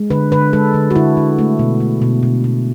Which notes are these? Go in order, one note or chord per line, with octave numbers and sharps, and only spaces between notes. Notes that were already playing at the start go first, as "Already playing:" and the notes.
Already playing: G#3
D3 B4
D3 B4
G#3 A4
D3
F#4
D3 E4
D3
A3
B2
A3
B2
B2
B2